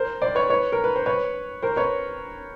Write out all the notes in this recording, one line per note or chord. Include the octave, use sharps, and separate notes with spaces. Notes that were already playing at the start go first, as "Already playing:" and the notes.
Already playing: A#4 C5
C5 D5
B4 C#5
B4 C#5
A#4
B4
C5
B4 C#5
A#4 C5
B4 C#5